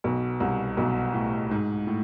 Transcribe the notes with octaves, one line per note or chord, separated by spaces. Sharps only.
B1 B2
C2 C3
B1 B2
A2
G#2
A2